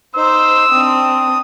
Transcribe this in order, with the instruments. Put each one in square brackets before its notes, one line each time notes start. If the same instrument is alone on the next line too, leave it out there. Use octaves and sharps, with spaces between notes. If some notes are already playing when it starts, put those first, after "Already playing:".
[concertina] D#4 [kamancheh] C5 [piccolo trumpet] E6
[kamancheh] C4 D4 [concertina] D#6